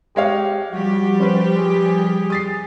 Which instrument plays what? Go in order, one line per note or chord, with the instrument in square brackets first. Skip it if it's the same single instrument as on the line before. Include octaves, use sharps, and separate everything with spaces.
[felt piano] G#3 C#5 F5 [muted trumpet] G4
[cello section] F3 G3 G4 [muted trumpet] F#4
[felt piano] C#4 B4 [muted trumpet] C5
[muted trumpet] G#4
[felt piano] D#6 A6 C7